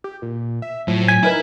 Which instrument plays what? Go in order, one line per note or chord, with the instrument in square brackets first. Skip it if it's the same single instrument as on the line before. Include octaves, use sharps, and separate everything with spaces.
[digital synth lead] G4
A#2
E5
[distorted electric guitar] A2 [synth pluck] F3 [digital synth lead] F#3
[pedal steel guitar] G#5 [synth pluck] B6
[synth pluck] D#4 A#4 B4 [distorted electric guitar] E4